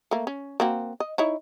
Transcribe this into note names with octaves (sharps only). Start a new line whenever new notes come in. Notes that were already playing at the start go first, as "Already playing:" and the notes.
A3 A#3
C#4
A#3 C4 F#4
D#5
D#4 E4 C#5